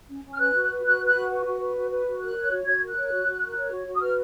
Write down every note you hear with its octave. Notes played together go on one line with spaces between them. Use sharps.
C#4
C#4
F6
B4 F#6
F#4
B4
F#4 F#6
B4
F#6
F#4
B4
F#4
B4
F#4
B4
F#4
A#4 F#6
C#5
F#4
F#4 G#6
A#4
F#6
C#5
F#4
F#4
A#4
C#5
F#4
F#4
D#6
B4 F6